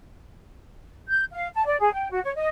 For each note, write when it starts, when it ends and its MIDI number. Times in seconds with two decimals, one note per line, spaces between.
1.08 1.24 91
1.32 1.47 77
1.54 1.65 81
1.65 1.78 74
1.79 1.92 68
1.93 2.10 79
2.11 2.19 66
2.24 2.33 73
2.36 2.47 75